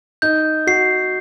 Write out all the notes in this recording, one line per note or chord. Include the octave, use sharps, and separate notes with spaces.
D#4 G6
F#4 C7